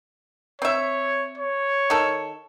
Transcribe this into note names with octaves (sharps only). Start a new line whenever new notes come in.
C4 C#5 E5
C#5
D#3 A4